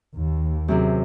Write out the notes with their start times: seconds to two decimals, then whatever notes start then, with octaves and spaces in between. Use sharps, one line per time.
0.15 D#2
0.68 F#2 C3 G#4